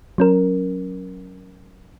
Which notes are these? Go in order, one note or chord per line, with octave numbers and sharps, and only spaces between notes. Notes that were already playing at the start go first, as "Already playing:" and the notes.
F#3 C#4 A#4